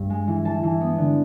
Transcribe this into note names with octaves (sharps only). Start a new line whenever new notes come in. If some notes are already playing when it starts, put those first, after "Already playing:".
Already playing: G2
G#3
E3
E3 A5
E3
B3
D3